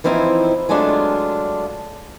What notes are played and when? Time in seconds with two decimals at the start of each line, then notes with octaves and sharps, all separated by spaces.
0.04 E3 F3 C4 D#4 E4
0.69 F#3 G#3 A3 D4 F4